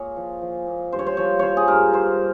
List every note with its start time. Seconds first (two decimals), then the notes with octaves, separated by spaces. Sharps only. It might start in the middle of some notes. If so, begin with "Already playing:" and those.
Already playing: A#2 G#4 C#5
0.16 F3
0.42 F3
0.67 A#2
0.92 G2 C5
0.99 C#5
1.07 C5
1.17 F3 C#5
1.39 F3 C5 C#5
1.57 G#4
1.68 G2 A#4
1.93 A#2 C5